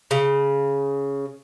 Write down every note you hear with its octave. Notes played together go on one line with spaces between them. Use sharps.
C#3